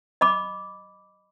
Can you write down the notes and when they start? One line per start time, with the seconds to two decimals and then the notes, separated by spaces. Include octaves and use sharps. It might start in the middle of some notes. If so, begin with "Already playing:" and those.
0.21 D#5 B5 D6